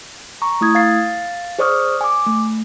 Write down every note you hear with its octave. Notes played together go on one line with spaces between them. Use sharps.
A#5 C#6
A3 E4 D#6 G#6
F5 A6 C7
G#4 C5 D5 C#6 D#6 F6
G#5 D6
A3